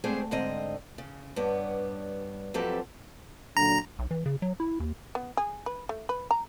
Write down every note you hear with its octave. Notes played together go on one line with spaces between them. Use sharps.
G#3 A3 C4 D4 G#4 C5
G#2 D3 C4 D#5
C#3
G2 G3 B3 C#5
F2 F#3 C4 G4 A4 B4
A#2 D3 F#3 A#5
B1
E3
C#3
F#3
E4
D#2
B3
G#4
B4
A3
B4
A#5